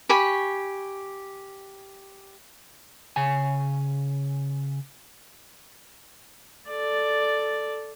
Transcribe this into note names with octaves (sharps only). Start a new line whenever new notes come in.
G4 G#5 B5 C#6
C#3 G#5
A4 D5